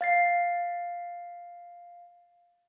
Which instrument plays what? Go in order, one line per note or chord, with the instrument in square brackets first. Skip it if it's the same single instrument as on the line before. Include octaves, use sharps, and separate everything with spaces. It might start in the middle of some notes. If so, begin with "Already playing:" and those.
[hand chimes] F5 A6 C7